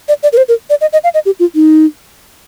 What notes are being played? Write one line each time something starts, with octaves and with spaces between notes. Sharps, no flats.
D5
D5
A#4
C5
A#4
D5
D#5
D#5
F5
D#5
G4
F4
D#4